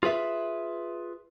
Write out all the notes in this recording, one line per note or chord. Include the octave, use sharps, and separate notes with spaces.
F4 G#4 B4 E5